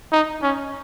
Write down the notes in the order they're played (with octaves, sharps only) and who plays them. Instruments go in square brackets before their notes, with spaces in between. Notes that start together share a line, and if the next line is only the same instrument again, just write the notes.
[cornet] D#4
C#4